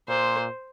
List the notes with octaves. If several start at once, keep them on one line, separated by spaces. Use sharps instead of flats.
A#2 C5